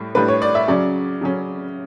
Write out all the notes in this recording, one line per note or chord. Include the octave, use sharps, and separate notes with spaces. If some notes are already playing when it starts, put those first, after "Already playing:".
Already playing: A2 G3
A2 G3 D4 B4
C#5
D5
E5
C#3 F#3 C#4 D5
C#3 F#3 C#4